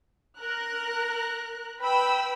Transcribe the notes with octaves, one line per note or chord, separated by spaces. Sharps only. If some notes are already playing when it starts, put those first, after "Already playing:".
A#4 F#6
B4 G5 B5 E6